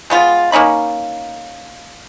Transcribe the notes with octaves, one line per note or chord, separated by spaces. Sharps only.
G#3 B3 F4
A#3 C#4 D#4 B5